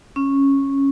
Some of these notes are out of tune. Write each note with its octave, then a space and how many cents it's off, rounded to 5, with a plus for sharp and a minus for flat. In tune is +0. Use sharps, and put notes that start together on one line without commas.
C#4 -10